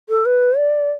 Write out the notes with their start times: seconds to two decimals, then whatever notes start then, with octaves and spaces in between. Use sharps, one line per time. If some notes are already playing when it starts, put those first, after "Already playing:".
0.09 A4
0.25 B4
0.58 D5